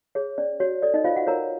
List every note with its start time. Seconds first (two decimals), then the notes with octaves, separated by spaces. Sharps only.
0.15 G#4 C#5
0.38 C#4 D5
0.60 F#4 C#5
0.82 A4 D5
0.94 D#4 D#5
1.04 F4 C5 F5
1.16 F#4 F#5
1.27 A#4 C#5 A#5